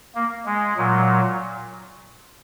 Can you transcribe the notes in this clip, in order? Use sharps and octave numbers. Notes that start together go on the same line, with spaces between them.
A#3
G#3
A#2 F#3